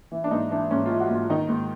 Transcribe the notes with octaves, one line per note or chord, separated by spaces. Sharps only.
E3
D4
G#2 D#4
E3 D4
G#2 C#4
F4
E3
F#4
G#2
F4
D#3 D#4
G#2